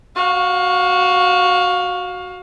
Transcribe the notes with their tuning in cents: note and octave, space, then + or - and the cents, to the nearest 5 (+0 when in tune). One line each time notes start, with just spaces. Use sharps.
F#4 +0 F5 +25